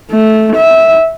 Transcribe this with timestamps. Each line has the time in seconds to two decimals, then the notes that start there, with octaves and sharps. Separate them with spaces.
0.11 A3
0.56 E5